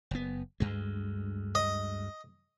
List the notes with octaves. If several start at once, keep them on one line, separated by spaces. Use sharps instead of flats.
F#1 B3
D2 G2 G#3
D#5